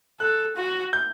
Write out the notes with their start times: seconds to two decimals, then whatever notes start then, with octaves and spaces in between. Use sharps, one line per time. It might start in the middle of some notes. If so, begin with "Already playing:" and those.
0.20 A4 F#6
0.56 F#4
0.93 G6